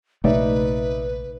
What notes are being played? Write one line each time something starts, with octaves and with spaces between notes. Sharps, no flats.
A#1 C3 A3 D#4 B4 D5 E5